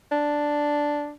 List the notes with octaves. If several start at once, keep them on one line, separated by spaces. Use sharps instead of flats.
D4